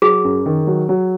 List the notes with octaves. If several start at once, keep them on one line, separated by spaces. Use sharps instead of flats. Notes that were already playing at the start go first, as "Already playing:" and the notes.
F#3 G#4
F#2
D#3
F#3
F#3